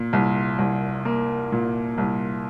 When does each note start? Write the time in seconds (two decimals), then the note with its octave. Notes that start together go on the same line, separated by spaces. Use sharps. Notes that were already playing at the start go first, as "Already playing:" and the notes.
Already playing: A#2
0.13 C2
0.59 C2
1.05 A#3
1.52 A#2
1.98 C2